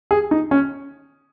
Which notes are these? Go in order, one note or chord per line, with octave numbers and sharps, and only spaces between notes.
G#4
D#4
C#4